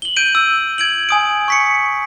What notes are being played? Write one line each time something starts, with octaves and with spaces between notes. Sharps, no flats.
F#7 G7
G6 D7 D#7
E6
G#6 D7 F#7
G#5 D#6 D7
C#6 B6 C#7